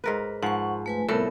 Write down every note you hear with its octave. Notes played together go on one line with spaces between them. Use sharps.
G#2 A#4 B4
G#2 F3 F#5 C#6
A3 B4 G#5
C2 A2 A3 B3 A4 A#4